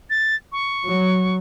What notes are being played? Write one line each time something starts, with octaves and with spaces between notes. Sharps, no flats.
A6
C#6
F#3